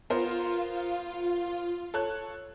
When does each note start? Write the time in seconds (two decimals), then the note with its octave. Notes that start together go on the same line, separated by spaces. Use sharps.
0.10 B3 F4 A#4 C5
1.94 A4 C#5 F#6